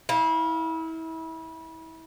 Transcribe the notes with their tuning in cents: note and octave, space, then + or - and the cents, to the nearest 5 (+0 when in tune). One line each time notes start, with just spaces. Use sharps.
E4 -30 F5 +0